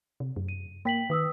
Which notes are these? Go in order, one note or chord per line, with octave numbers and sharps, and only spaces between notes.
C3
F#2
D#7
A#3 G5 B6 F#7
D#3 B4 D#6 E6